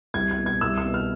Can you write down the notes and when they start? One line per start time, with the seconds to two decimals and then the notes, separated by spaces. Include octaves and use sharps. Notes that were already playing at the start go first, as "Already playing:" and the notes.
0.14 C2 G#6
0.31 G#6
0.39 B2
0.46 G#6
0.61 C2 E6
0.78 E6
0.85 B2
0.94 F6